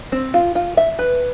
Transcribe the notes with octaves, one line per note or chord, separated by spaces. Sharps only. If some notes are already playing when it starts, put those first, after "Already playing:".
C4
F4
F4
E5
B4